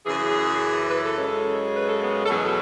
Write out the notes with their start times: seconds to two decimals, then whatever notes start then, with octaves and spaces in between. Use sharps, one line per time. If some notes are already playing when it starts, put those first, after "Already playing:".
0.05 F#2 C#3 E3 G#4
0.90 B4
1.04 A4
1.18 F#2 C#3 G#3
1.75 B4
1.88 A4
2.02 B3
2.25 A4
2.30 E2 B2 F#3 G#4
2.44 A4